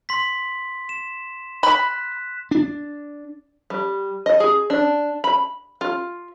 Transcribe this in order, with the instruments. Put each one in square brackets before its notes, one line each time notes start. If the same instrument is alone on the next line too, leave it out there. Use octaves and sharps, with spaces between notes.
[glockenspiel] C6 B6
E7
[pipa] B5 [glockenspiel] F#6 B6
[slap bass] D4
[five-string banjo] G3
D#5
G#4
D4
B5
F4